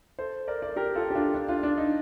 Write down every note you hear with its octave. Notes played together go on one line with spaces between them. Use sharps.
A4 C5
A#4 D5
A#4 D5
G4 A#4
F4 A4
G4
D4 F4
D4
D4 F4
D4
D#4